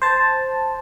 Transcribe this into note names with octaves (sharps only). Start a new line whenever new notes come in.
C5 A5